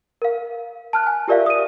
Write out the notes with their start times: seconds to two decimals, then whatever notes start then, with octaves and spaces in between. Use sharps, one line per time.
0.22 A#4 F5
0.93 A5 F6 F#6
1.07 G#5
1.28 F4 G4 A#4 D5 E5 F5
1.46 D#6 D#7